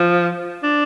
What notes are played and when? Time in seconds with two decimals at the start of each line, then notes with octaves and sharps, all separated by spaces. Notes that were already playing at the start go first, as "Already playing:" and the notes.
Already playing: F3
0.63 D4